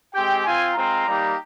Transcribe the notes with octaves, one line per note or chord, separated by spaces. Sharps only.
G#3 C4 G4 G5
C4 F4 G#5
G#3 C4 F4 A#5
G3 A#3 D#4 G4